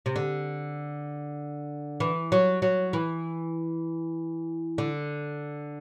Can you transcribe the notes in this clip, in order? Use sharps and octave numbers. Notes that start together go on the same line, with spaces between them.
C3
D3
E3
F#3
F#3
E3
D3